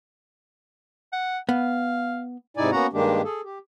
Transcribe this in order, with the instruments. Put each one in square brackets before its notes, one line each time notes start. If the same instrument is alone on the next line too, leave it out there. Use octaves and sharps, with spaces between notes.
[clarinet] F#5
[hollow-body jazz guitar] B3 [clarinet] F5
[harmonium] G#2 C3 D#4 E4 D5 G#5
A#3 B3 C#4 F#4 F#5 A#5
G2 D#3 G#3 A#3 D4 G4
G#4 A4
G4